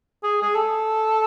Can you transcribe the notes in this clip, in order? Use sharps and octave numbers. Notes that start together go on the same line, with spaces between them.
G#4
G#4
A4